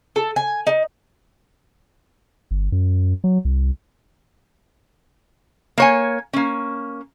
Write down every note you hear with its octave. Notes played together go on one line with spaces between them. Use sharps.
A4
G#5
D#4
G1
F#2
F#3
C2
A#3 C#5 G#5
A#3 C#4